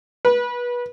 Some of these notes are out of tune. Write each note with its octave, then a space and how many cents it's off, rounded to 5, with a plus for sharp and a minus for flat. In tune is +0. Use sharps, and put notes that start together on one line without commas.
B4 -25